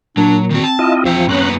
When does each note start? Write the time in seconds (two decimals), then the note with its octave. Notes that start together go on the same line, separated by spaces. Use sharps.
0.17 A#2 F#3 D4
0.51 D#3 C4 F#4
0.64 A5
0.79 E4 F4 D#5
1.05 E2 F3 E5 G5
1.29 F#2 A#3 B3 C#4 F#6